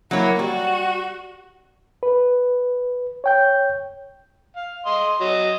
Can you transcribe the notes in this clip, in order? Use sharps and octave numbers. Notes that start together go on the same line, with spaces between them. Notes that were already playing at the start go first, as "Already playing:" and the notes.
F#3 A#3 E4 C#5
G3 F#4
B4
C#5 G5 G6
F5
D#5 C6
F#3 D#5